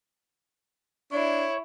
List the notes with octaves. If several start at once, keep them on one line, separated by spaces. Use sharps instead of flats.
D4 E4 C#5